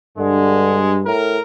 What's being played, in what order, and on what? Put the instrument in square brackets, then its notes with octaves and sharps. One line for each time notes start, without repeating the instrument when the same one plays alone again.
[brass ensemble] G2 [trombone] D3 [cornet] G#3
[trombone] A2 [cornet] A#4